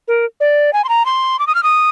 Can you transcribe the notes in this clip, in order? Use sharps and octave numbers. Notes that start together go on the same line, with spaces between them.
A#4
D5
G#5
C6
A#5
C6
D6
D#6
F6
D#6